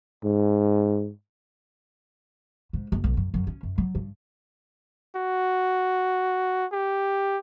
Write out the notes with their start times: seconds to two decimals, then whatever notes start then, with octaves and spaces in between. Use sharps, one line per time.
0.24 G#2
2.73 G#2
2.92 F#1
3.04 B1
3.17 F#2
3.34 F#2
3.47 C#4
3.63 F#2
3.78 F#3
3.95 G2
5.16 F#4
6.72 G4